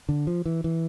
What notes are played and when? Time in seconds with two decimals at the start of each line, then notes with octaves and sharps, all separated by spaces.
0.09 D3
0.27 F3
0.46 E3
0.64 E3